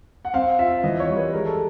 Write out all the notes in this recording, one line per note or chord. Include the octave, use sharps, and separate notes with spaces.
F#5
C4 F5
F4 E5
E3 D#5
C#5
G3
B4
G#3 A#4
A4